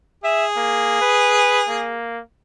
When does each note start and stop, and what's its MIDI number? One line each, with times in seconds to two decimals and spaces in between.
0.24 1.97 68
0.24 0.45 76
0.56 0.98 58
1.01 1.62 71
1.68 2.20 58